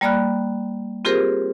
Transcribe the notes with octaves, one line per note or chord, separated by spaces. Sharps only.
G3 A#3 D5 B5 F6 F#6
C4 F4 G4 G#4 A#4 C5